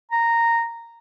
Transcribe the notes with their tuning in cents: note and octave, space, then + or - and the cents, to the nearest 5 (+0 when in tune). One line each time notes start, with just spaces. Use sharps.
A#5 -10